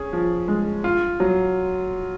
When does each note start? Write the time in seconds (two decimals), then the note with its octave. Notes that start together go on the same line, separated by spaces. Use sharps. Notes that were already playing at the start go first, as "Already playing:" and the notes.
Already playing: C#4 G#4
0.13 F3
0.48 G#3
0.84 F4
1.20 F#3